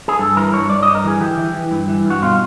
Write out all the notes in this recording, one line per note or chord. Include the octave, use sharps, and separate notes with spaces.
G#4
G2 A4
E3 A#4
G2 C#5
G2 D5
G2 D#5
A#4
E3 G#4
E3 G4
E3
E3
G2
E3
G2
F#4
B2 F4